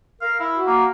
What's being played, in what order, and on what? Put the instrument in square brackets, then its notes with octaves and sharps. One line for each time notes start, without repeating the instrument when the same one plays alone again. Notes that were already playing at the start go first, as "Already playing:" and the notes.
[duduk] A#4 [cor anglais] F5
[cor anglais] E4
[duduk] F#4
[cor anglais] A#3